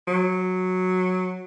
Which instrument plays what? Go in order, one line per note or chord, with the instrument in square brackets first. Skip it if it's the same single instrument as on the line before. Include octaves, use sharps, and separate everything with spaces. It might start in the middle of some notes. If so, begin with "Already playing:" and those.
[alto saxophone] F#3